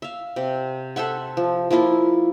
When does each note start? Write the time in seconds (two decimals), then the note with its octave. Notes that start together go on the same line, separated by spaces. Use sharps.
0.02 E5 F5
0.36 C3
0.96 A4 C5 E5 F#5
1.37 F3
1.71 F3 A#3 E4 F4